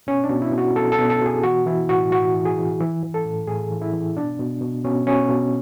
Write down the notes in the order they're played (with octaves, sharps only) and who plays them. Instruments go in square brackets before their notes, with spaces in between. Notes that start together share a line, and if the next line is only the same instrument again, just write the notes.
[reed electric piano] B2 C#4
D4
B2
E4
B2
F#4
B2 A4
A4
B2
A4
B2
G#4
E3 F#4
E3 E4
A2 F#4
A2 F#4
E3
G#4
E3
E3
E3
A4
A2
A2 G#4
E3
E4
E3
B2 D4
B2
B2
B2 C#4
B2 C#4
B2